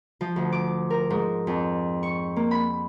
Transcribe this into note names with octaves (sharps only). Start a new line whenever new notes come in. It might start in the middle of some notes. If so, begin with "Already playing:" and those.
F3
D2
D6
A#4
G#2
F2
C#6
A#3
B5